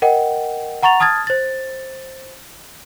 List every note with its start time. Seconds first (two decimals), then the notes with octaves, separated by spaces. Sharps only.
0.02 A#4 D#5 F#5 G5
0.82 F#5 A#5 C#6 A6 F7
1.00 A5 D#6 F6 G#6 A6
1.27 C5 A6